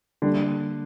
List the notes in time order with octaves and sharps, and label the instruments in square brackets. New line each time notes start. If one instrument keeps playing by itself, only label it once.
[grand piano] D3 [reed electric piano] G3 A#3 D4